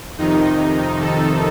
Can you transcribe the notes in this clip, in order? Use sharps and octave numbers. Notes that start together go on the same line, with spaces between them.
F2 C3 D#3 D#4
A4